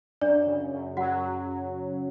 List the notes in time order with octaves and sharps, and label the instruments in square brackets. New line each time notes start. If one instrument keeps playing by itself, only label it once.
[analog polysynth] F#2 [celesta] D4 D5
[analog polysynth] C#3
F#2
[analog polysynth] F#3 [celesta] F#4 F#5